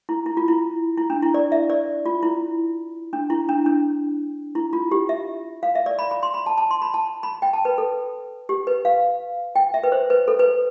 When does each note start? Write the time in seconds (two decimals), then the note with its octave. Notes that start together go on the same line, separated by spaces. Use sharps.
0.09 E4
0.26 E4
0.37 F4
0.48 E4
0.98 E4
1.10 D4
1.23 E4
1.34 D5
1.52 E5
1.70 D5
2.06 F4
2.23 E4
3.13 D4
3.30 E4
3.49 D4
3.66 D4
4.55 E4
4.73 F4
4.92 G4
5.09 E5
5.63 F5
5.75 E5
5.86 D5
5.99 B5
6.11 B5
6.23 C6
6.34 B5
6.46 A5
6.58 A5
6.71 C6
6.82 B5
6.94 A5
7.23 B5
7.42 G5
7.53 A5
7.65 B4
7.78 A4
8.49 G4
8.67 B4
8.85 F5
9.56 G5
9.74 E5
9.84 B4
9.92 C5
10.10 B4
10.28 A4
10.39 B4